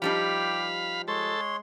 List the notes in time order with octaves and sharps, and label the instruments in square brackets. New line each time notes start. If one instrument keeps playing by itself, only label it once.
[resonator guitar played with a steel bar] F3 G3 D#4 [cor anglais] G4 [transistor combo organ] F5 B5
[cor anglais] G#3 [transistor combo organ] A4 [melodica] C#5 C6